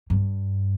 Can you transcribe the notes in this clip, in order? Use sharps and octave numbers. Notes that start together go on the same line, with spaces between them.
G2